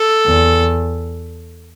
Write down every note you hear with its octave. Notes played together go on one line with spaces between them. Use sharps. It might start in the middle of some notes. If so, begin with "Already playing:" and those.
Already playing: A4
E2